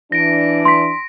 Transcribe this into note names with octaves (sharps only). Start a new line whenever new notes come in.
E3 D4 A#6 D7
C6 B6